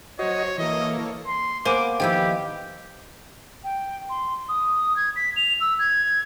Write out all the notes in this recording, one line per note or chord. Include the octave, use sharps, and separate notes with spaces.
F#3 F#4 C5 C#5 D#5
E3 A#3 A4 C#5 D#5
C6
A#3 B3 A#4 C5 G#5 D6
D#3 F3 E4 G4 G5
G5
C6
D#6
G#6
B6
F7
E6
G#6